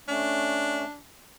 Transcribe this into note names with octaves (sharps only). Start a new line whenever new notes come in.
A3 C#4 D4